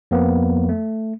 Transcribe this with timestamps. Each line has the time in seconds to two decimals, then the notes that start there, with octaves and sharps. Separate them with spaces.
0.11 F2 F3 A#3 B3
0.69 A3